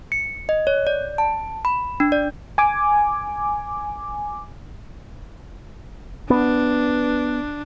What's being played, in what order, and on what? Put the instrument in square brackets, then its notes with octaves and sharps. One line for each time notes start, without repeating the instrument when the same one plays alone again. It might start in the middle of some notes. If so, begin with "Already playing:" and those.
[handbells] C#7
D#5
C#5
D5
A5
B5
D4
D5
[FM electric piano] G#5 D6
[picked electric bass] B3 [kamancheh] D4